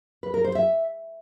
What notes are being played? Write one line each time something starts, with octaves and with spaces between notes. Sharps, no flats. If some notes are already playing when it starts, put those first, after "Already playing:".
B4
A#4
C5
E5